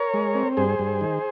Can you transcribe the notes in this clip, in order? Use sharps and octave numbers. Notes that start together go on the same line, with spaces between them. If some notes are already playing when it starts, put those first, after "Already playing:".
Already playing: A#4 C#5
G#3
C4
G2 G#4 C5
G2
D#3